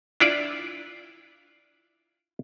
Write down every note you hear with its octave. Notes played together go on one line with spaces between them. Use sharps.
D4 E4 F4 D5